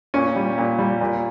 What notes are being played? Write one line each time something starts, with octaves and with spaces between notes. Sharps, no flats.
A#2 C#4
G3
A#2
G3
A#2